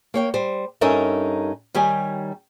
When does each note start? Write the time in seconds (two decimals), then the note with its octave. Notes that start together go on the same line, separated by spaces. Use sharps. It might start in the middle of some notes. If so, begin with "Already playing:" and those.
0.14 A#3 C#5 G5
0.34 G3 C5
0.81 G2 C#4 D#4 A4 A#4 E5
1.74 D#3 G3 G4 C#5 G#5